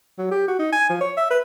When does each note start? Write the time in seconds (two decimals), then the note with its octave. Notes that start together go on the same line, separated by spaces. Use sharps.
0.18 F#3
0.31 G4
0.48 F#4
0.59 D#4
0.72 G#5
0.90 F3
1.01 C#5
1.17 E5
1.30 B4